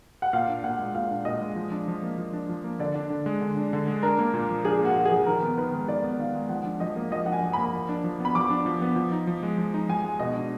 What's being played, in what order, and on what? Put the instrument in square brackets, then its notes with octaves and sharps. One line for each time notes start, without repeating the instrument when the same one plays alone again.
[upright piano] F#5
[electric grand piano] A#2 [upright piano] F5
[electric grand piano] D4
[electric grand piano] A#2 [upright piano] F#5
[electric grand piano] G#3
[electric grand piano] A#2 [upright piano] F5
[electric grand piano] D4
[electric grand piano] A#2 [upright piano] D#5
[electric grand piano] G#3
F3
D4
F3
A#3
F3
D4
F3
A#3
[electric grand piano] D3 [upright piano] D5
[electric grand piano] D4
D3
G#3
D3
D4
D3
G#3
[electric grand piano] D4 [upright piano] A#4
[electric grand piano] A#3
A#2
F3
[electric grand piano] D4 [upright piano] G#4
[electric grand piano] A#3 [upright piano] F#4
[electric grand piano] A#2
[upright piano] G#4
[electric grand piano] F3
[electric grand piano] D#3 [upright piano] A#4
[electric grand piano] B3
[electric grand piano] D#3 [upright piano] B4
[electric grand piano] G#3
[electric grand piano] D#3 [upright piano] D5
[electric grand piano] B3
[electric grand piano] D#3 [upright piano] F5
[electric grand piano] G#3
[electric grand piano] F3 [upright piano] F#5
[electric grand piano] D4
[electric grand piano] F3 [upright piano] D#5
[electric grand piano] A#3
[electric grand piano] F3 [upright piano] D#5
[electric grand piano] D4 [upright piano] F#5
[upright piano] G#5
[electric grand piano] F3
[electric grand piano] A#3 [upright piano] B5
[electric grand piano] F3
D4
F3
[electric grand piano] B3 [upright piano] B5
[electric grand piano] F3 [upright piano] D6
[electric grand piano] D4
F3
B3
F3
D#4
F3
G#3
F3
D#4
[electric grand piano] F3 [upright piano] G#5
[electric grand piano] G#3
[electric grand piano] B2 [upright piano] D#5
[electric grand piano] D4